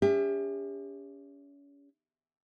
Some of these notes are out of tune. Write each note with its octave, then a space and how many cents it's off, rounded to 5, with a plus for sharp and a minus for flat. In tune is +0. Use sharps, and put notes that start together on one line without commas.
C#4 +35 G4 +40 E5 +0